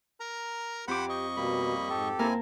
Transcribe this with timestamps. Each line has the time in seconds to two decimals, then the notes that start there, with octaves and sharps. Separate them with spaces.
0.20 A#4 A#5
0.88 F2 G4 C5 F#5 B5 D6
1.09 D#5 C#6
1.36 B2 G3 A#3 B5
1.90 G#2 G4 A4
2.19 A#3 C4 E4 A#4 G#5 A5